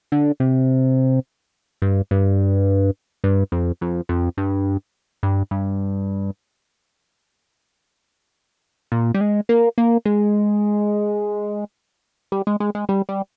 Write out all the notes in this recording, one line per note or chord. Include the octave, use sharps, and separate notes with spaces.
D3
C3
G2
G2
G2
F2
F2
F2
G2
G2
G2
A#2
G3
G#3
A#3
A#3
G#3
G3
G#3
G#3
G#3
G3
G3